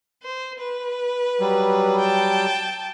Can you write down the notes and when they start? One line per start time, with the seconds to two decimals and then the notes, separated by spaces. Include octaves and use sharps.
0.22 C5
0.59 B4
1.40 F#3 G3
1.99 G5 A5